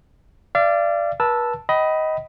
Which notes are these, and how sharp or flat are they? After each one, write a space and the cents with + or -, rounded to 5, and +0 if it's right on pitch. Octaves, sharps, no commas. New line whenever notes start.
D5 +0 F5 -40
B4 -40 A5 +0 E6 +0
D#5 +15 G5 -40 B5 +0